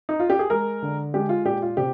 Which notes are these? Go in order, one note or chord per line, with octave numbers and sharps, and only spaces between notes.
D#4
F4
G4
G#4
G#3 A#4
D3
G#3 G4
F4
A#2 G4
F4
C3 G4